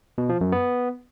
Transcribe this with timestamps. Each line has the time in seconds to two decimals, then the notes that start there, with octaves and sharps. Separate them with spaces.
0.18 B2
0.29 F3
0.41 F#2
0.52 B3